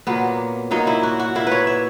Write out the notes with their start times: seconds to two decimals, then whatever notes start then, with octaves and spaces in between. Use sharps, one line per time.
0.07 A#2 F#3 A#3 B3
0.71 A#2 F#3 A#3 D#4
0.87 E4
1.03 F#4
1.20 F#4
1.35 A#2 A#3 E4
1.47 B4 C#5
1.67 E5